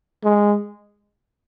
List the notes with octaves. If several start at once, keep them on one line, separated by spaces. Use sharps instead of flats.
G#3